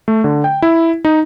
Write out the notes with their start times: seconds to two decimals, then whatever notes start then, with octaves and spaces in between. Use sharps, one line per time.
0.08 A3
0.24 D3
0.44 G5
0.62 E4
1.05 D#4